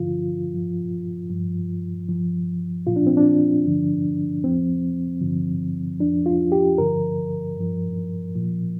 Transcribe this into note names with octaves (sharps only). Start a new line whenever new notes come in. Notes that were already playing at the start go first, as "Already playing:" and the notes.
Already playing: G2 D3 F3 F4
G2 F3
G2 F3
G2 F3
A#2 F3 F4
D4
C4
D4
G2 D3 F3
F2 F3 C4
G2 D3 F3
F2 F3 D4
F4
G4
G2 D3 F3 A#4
G2 F3
A#2 F3